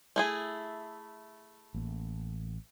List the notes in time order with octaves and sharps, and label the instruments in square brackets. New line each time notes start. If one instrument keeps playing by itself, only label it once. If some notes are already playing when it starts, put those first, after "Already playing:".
[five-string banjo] A3 E4 G#4
[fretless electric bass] A1 A#3